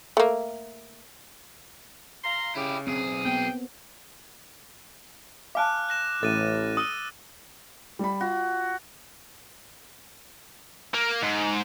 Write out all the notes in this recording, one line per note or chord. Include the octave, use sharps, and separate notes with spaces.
A3 A#3
F5 A#5 C6
C#3 E4 G4
B1 C4 G#4
A#3 B3 G5
F5 G#5 A5 D6 F6 F#6
F#6 A#6 E7
A1 A2 A4 A6 D#7
D#6 E6 D#7 G7
G3 B5
F4 F#4
A#3
G#2